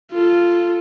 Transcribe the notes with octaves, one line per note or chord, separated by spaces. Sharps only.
F4 A4